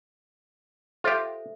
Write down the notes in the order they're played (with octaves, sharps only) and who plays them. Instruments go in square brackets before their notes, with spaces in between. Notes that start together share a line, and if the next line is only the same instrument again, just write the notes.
[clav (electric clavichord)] F4 G4 [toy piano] A4 C5 E5